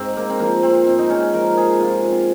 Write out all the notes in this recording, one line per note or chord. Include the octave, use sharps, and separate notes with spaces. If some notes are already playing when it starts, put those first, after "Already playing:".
Already playing: G#2 C4
A#3
C4
F3 A#3
C4
G#2 C4
D#4
C#4
F3 A#4
G#4
C3 F4
C4